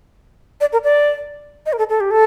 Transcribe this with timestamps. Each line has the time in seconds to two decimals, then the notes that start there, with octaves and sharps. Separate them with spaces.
0.61 D5
0.73 A#4
0.84 D5
1.66 D#5
1.73 A#4
1.78 A4
1.89 A4
2.00 G4
2.11 A4